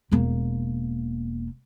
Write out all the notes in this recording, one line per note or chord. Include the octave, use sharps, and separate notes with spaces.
E1 A#3